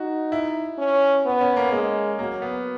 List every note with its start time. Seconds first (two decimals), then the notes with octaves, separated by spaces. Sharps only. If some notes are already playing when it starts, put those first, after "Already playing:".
Already playing: D#4 F#4
0.32 E4
0.78 C#4
1.25 B3
1.41 C#4
1.57 A#3
1.72 G#3 A#3
2.19 F#3 A#3
2.42 B3